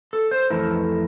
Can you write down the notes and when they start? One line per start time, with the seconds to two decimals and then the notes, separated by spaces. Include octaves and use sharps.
0.13 A4
0.31 C5
0.50 F2 E3 A3 E4 A#4